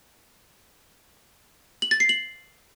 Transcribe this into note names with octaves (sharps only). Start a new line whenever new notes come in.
F#7
A6
C7
F#7